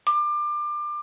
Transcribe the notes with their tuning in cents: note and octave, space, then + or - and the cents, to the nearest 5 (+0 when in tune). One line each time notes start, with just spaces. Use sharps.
D6 +25